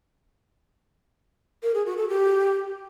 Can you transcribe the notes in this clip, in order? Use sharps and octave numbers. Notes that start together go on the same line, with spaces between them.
A#4
G#4
F#4
A4
G4